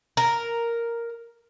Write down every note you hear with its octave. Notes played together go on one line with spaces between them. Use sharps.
A#4